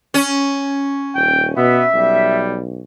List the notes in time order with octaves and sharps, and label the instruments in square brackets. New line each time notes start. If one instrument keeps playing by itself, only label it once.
[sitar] C#4
[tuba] D#1 [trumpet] G5
[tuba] B2 [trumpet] B3 [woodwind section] E5
[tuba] B1 [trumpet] G3